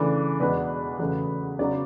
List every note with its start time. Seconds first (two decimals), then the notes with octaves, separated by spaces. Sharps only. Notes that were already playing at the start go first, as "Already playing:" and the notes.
Already playing: C#3 E3 A3 D4
0.40 E2 B2 G#3 B3 D4 B4
0.99 E2 C#3 F#3 A3
1.59 C#3 F#3 B3 D4 D5